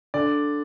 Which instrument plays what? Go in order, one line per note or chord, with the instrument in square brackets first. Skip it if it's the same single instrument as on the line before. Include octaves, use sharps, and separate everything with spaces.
[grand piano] D3 D5